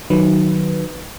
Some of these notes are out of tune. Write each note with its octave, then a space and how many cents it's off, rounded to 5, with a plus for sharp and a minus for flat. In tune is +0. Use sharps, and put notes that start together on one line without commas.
D#3 -10 F#3 +0 B4 +0